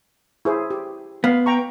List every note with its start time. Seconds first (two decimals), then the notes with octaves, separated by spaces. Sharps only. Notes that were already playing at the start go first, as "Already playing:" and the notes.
0.45 E4 G#4 C5
0.71 G4
1.24 B3 F5
1.46 G5 A#5 C#6